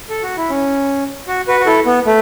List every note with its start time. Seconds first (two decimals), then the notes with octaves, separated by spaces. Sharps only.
0.09 A4
0.23 F#4
0.37 E4
0.49 C#4
1.28 F#4
1.48 F#4 B4
1.60 F#4
1.66 E4 A4
1.86 B3
2.06 A3